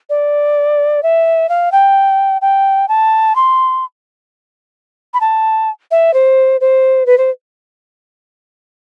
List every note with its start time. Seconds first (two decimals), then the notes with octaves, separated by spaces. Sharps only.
0.10 D5
1.03 E5
1.49 F5
1.72 G5
2.42 G5
2.88 A5
3.36 C6
5.14 B5
5.21 A5
5.91 E5
6.14 C5
6.61 C5
7.06 B4
7.18 C5